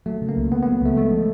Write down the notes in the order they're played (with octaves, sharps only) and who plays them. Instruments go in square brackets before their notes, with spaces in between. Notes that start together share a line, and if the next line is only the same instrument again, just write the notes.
[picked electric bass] F#3 [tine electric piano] A3
[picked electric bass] C#3
[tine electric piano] A#3
[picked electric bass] C#2
[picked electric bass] C#2 [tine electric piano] B3
[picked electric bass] F#3 [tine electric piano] B3
[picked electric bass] C#3 [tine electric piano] A3
[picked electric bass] G#3 [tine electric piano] A3
[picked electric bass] F3